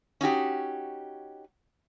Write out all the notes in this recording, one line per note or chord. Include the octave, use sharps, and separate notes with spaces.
C#4 D#4 F#4 G4